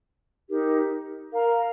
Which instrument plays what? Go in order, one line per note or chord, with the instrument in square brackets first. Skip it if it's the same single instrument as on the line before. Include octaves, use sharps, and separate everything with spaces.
[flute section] D#4 G4 A#4
A#4 F5 A#5